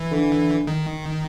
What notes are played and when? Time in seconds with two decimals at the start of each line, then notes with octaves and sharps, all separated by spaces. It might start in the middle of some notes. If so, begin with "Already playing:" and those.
Already playing: E3
0.11 D3
0.67 D#3